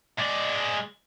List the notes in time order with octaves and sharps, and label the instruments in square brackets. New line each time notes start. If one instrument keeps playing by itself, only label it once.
[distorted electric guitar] G#3 D5